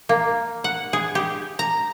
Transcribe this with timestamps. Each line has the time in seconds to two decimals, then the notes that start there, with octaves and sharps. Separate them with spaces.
0.09 A#3
0.64 F#5
0.93 G#4
1.15 G4
1.59 A#5